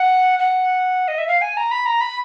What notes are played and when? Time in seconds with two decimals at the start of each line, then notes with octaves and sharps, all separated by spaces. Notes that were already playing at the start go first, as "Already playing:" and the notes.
Already playing: F#5
0.39 F#5
1.08 D#5
1.18 E5
1.28 F5
1.41 G#5
1.57 A#5
1.71 B5
1.86 A#5
2.01 B5